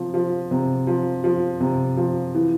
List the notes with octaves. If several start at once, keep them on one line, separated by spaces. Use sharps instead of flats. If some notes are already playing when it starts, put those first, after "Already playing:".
Already playing: C3 F3
F3
C3
F3
F3
C3
F3
E3